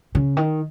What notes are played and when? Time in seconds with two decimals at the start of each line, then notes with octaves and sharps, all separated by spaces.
0.15 C#3
0.37 D#3